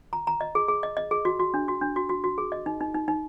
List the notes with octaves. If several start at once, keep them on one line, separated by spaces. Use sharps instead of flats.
A#5
A#5
D#5
G#4
G#4
D#5
D#5
G#4
F#4
F#4
D4
F#4
D4
F#4
F#4
F#4
G#4
D#5
D#4
D#4
D#4
D#4